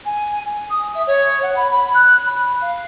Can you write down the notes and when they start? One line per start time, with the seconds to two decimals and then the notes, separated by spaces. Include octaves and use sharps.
0.05 G#5
0.45 G#5
0.70 D#6
0.95 E5
1.07 C#5
1.43 F#5
1.56 B5
1.71 B5
1.94 F#6
2.26 B5
2.61 F5